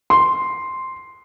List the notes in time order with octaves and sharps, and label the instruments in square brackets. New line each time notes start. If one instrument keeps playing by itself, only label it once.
[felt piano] C6